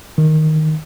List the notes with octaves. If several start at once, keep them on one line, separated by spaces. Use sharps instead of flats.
D#3